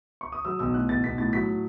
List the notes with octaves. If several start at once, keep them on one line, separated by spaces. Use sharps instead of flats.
C#6
D#6
F#3 E6
B1 E6
A2 F#6
B1 A6
B1 B6
A2 A6
F#3 B6
A2